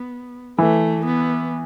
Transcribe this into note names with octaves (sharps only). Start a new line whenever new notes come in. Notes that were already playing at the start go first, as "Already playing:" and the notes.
Already playing: B3
E3 A3
B3